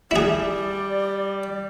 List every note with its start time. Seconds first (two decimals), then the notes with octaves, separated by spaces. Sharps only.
0.11 G3 E4 G#4 D5